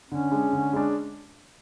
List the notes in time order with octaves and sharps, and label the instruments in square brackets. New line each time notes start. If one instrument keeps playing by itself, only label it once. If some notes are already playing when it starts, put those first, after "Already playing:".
[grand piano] D3 [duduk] C#4
[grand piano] G#3 D4
D3
G#3 D4